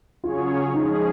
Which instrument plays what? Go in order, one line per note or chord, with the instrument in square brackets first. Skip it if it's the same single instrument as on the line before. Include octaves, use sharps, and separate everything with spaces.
[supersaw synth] C#3 F#3 C#4 G#4 C#5 [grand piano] F4
[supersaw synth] F3 G#3 C#4 G#4 [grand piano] D#4